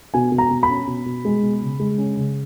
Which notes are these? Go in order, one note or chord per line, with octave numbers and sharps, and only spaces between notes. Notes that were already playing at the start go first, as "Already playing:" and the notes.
B2 G#5
B2
A#5
B2
B5
C#4
B2
B2
G#3
B2
C#3
G#3
C#4
C#3